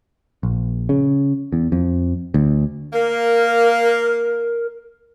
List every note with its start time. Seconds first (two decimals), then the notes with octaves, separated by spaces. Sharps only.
0.43 A#1
0.89 C#3
1.53 E2
1.72 F2
2.34 D2
2.93 A#3 A#4